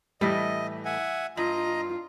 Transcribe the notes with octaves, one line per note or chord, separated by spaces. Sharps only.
A2 E3 G3 D#5
E5 F#5 G#5
G2 F4 D#5 A#5